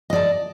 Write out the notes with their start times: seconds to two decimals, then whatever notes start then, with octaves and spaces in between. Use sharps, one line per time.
0.10 D#5
0.13 D5
0.16 A5